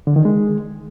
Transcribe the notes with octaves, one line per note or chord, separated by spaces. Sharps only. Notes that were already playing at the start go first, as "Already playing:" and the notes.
D3
D#3
G#3